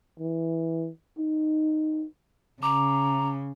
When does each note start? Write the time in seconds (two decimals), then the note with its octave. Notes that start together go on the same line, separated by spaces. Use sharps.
0.19 E3
1.18 D#4
2.63 C#3 A#5 D6